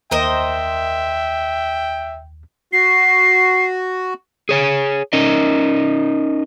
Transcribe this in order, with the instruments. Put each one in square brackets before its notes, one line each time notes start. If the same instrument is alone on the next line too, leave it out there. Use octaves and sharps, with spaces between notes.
[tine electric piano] D#2 [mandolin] A#4 C5 D#5 [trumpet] E5 [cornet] G5
[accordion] F#4 [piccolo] C7
[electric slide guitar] G#4 C#5 G#5
C#4 D#4 A#4 D#5